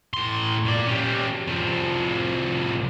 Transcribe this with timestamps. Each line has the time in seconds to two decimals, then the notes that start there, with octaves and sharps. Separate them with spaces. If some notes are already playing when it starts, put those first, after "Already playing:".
0.14 A2 C6
0.65 A#2 D5
0.87 C#4 G4
1.47 C2 F3